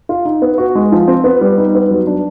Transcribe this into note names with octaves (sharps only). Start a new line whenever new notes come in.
F4
D#4
B3
F#4
G#3
F3
C4
B3
G3
D#4
B3
F#3
D4